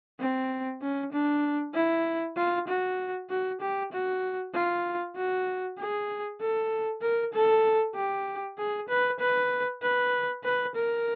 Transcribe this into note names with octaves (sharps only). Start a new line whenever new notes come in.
C4
C#4
D4
E4
F4
F#4
F#4
G4
F#4
F4
F#4
G#4
A4
A#4
A4
G4
G#4
B4
B4
B4
B4
A#4